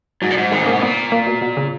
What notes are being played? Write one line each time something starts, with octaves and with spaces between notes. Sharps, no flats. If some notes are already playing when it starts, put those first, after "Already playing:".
G#2 F#3
A#2
G#2
D#3 G#3
C#3
B2 A#3
A#2 B3
A#3
B2
B2
C#3